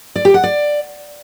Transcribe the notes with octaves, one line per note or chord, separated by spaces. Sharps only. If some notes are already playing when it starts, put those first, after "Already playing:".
D5
G4
F#5
D5